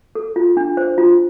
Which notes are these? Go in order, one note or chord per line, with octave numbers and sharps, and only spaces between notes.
A4
F4
D4
C5
F4